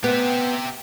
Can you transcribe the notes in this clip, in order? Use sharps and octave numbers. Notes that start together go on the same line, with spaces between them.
B3 G4 E5